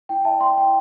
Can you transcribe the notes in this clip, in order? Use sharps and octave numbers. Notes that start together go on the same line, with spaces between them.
E4 G5
G5
E5 A5
D5
G5 C6
E4
G5